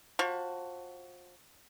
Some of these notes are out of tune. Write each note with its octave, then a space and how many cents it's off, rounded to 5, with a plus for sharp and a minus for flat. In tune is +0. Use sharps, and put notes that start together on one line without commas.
F3 +30 F#4 +20